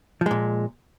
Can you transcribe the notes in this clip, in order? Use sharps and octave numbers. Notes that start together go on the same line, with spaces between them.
A#2 F3 G#3